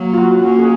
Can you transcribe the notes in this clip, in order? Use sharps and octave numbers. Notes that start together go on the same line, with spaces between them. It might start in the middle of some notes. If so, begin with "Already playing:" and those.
Already playing: F#3 A#3
F4
F#4
A#3 C#4 F#4
G#4